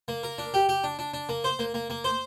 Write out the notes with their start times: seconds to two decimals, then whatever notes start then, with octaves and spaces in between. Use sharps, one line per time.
0.08 A#3
0.23 A#4
0.38 D4
0.54 G4
0.69 G4
0.84 D4
0.99 D4
1.14 D4
1.29 A#3
1.44 C5
1.59 A#3
1.74 A#3
1.90 A#3
2.04 C5